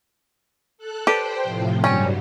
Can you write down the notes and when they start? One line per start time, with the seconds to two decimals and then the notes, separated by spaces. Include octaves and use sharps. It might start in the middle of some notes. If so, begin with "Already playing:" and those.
0.78 A4 F#6
1.07 G4 A4 B4 C5 D5 G5
1.43 A2 C3 F3
1.84 G2 F#3 G3 C#4 D5 G5 G#5